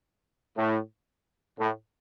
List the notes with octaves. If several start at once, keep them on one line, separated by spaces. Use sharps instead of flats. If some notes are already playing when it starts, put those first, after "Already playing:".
A2
A2